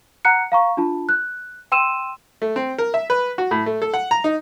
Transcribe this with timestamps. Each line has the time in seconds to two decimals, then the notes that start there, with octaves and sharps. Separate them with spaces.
0.25 F#5 A#5 F#6 C#7
0.52 F5 A#5 C#6
0.77 D4 F4 A5
1.09 F#6
1.72 G5 C6 E6 D#7 E7
2.42 A3
2.56 C4
2.78 A#4
2.94 E5
3.10 B4
3.38 F#4
3.51 A2
3.66 A3
3.82 A4
3.94 F#5
4.11 A#5
4.24 D#4